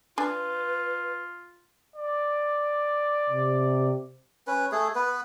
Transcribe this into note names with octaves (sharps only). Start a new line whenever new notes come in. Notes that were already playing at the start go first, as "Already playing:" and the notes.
D4 F4 B4 G#5
D5
C3
C#4 B4
A3 G#4
B3 B4